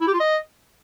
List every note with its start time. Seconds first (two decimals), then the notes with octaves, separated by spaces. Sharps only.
0.01 E4
0.07 G4
0.14 F4
0.20 D#5